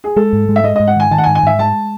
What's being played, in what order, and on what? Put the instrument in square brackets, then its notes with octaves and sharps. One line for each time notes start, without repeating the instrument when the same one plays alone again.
[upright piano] G#4
[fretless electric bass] G#3 [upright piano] A4
[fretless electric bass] G#2
G#3
[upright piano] E5
[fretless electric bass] G#3 [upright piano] D#5
[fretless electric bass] G#2 [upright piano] D#5
[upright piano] F#5
[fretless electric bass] D#3 [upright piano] G#5
[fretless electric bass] D#3 [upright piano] A5
[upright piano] F#5
G#5
[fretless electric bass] G#2
[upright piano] G#5
[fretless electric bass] G#2 [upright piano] E5
[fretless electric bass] G#3 [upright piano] A5